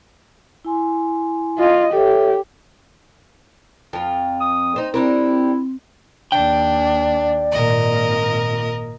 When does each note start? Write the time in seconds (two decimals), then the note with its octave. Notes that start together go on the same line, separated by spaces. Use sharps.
0.65 E4 G#5 C6
1.58 F4 D#5
1.92 G4 A4 C#5 E5
3.93 F2 F4
4.40 D#6
4.76 D#4 C5
4.94 G3 C4 D4 E4 A#4
6.32 D#2 D4 D5 G5
7.52 G#1 A#2 A#4 D#5